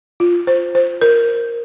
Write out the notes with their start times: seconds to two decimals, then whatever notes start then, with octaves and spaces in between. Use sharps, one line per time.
0.20 F4
0.47 C5
0.75 C5
1.01 A#4